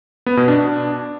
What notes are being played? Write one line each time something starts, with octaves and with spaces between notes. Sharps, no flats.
B3
B2
D4